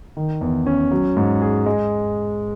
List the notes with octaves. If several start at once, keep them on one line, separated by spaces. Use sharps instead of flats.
D#3
E2
C#4
F#3
G#2
G#4
G#3